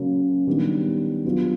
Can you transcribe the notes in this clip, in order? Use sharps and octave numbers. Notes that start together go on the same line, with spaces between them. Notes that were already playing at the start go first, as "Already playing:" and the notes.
Already playing: C#3 F#3 A#3 C#4
D#3 G3 B3 D4
F#3 B3 D4 F4